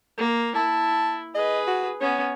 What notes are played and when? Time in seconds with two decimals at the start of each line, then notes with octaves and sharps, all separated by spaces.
0.18 A#3
0.55 E4 A5
1.35 G#4 B4 D#5
1.67 F#4
2.01 B3 C#4 C#5